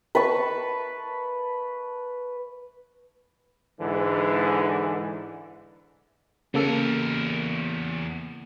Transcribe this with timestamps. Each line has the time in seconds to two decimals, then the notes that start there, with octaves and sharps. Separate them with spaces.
0.15 B4 A5 C#6
3.81 G#2 D3 E3
6.54 E2 C#3 A#3 A4 A#4